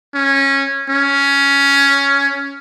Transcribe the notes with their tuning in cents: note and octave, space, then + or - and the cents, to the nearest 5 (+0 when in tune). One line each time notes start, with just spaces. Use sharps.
C#4 -15
C#4 +10